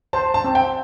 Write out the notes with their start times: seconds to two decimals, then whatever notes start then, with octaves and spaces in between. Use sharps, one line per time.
0.13 C5 A5
0.34 A5
0.44 C4
0.55 G5